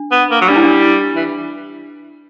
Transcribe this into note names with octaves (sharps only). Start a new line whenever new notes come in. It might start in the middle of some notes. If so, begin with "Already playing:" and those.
Already playing: D4
B3
A#3
F#3
G3 D4
E4
D4
E3